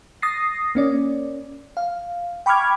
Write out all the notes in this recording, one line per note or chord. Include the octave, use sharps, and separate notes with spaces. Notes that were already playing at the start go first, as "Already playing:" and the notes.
D#6 A6 A#6 C7
A#3 C#4 D5
F5
G5 B5 C#6 D6 F6 G#6